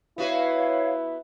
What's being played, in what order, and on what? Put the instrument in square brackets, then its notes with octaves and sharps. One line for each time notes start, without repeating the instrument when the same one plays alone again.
[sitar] B3 F#4 B4 [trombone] E4 [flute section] C#5 F5